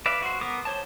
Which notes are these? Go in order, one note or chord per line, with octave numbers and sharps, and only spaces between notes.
B4 D5 E5 F5
F#4 C5
B3 A#4 D6 D#6
C5 C#5 A5